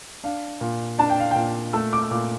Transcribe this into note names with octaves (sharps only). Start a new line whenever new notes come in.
D4 F5
A#2
D4 A5
G5
F5
A#2 G5
A3 E6
D6
E6
A#2 D6